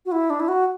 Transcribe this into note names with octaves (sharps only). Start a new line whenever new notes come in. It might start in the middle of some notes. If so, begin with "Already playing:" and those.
F#4
E4
D4
E4
F#4